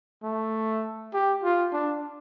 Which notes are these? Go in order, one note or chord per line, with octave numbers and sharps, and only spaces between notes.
A3
G4
F4
D4